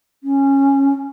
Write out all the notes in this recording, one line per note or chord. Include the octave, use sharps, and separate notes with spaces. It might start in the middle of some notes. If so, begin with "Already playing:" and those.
C#4